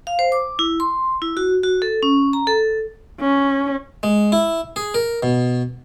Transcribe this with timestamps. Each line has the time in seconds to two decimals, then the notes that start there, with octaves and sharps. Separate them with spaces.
0.07 F5
0.19 C5
0.32 D6
0.59 E4
0.80 C6
1.22 E4
1.37 F#4
1.63 F#4
1.82 A4
2.03 C#4
2.33 A#5
2.47 A4
3.20 C#4
4.03 G#3
4.32 E4
4.76 G#4
4.94 A#4
5.23 B2